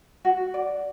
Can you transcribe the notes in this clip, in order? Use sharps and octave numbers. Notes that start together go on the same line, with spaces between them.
F#4
D5